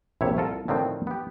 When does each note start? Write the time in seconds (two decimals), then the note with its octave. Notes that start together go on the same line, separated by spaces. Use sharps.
0.21 A#1 C3 E4 C#5
0.37 C2 F4 A4 A#4
0.68 A2 D3 D#3 F3 C4
1.07 B3 G4